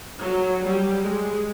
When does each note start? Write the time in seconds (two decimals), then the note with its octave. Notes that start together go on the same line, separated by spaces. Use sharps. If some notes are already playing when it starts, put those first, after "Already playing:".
0.21 F#3
0.62 G3
1.03 G#3